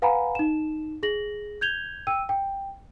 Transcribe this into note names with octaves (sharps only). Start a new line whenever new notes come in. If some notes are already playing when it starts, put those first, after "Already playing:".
B4 F5 F#5 G#5 A#5 B5
D#4 E7
G#4 A#6 F#7
G6 G#6 F7 G7
G5 E6 D#7
G5